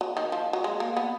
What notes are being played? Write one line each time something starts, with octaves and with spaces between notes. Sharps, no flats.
F#3
D#3
F3
F#3
G#3
A#3
B3